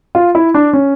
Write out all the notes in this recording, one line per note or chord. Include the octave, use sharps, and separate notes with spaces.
F4
E4
D4
C#4